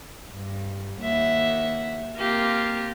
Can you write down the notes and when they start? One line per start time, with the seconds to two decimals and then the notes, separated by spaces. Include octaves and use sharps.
0.31 G2
1.02 D#2 E5 F#5
2.18 A#3 C4 F4 G4 A#4